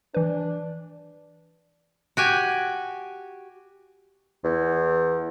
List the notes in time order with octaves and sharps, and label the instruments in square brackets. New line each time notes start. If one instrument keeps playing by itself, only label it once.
[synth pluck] E3 B4 [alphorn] D4
[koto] F#4 G4 G#5
[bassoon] E2